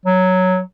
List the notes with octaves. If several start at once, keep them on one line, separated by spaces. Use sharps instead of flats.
F#3